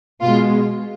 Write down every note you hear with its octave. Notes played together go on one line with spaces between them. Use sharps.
B2 G#3 F4